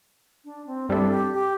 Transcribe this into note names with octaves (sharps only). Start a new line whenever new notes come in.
D4
C4
G2 G3 C4 D4 E4 A4
G4
G4